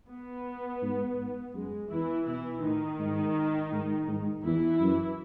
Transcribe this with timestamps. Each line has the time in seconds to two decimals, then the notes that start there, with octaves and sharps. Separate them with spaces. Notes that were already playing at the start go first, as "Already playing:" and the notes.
0.10 B3
0.82 G#2
1.18 G#2
1.54 F#2 G#3
1.90 E2 E3 E4
2.27 B2 E3 E4
2.63 A2 D#3 D#4
3.00 G#2
3.72 G#2
4.08 G#2
4.44 E2 E3 E4
4.80 F#2